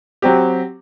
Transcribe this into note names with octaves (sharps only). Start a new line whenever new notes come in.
F#3 C4 G4